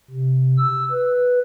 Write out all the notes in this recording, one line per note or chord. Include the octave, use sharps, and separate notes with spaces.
C3
E6
B4